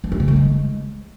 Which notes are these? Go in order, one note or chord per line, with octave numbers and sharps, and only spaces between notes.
F3
C#4
C#3
A3
G#3